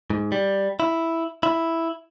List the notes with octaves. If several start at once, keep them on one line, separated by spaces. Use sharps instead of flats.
G#2
G3
E4
E4